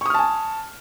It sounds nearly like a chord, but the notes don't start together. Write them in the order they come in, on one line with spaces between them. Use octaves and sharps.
C#6 D#6 F6 A5 G#5